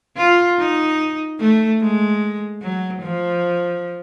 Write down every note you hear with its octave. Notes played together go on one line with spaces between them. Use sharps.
F4
D#4
A3
G#3
F#3
F3